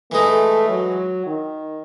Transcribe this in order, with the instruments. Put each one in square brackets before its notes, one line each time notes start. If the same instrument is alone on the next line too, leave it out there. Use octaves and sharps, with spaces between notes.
[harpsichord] E3 G#3 D#4 [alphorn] A3
[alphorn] F#3
D#3